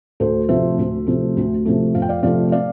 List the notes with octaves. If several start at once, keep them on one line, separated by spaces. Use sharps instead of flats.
D2 A4 C5
C3 F3 A3 C5 E5
D2
C3 F3 A3
D2
C3 F3 A3
F2 F5
G5
D5 F5
C3 F3 A3 D5 F5
D5 F5